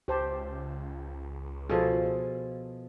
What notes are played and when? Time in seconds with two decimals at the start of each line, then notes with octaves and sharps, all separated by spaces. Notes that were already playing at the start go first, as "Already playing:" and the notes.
0.08 C#2 G4 C5 A5
1.70 B2 F3 G#4 A4 B4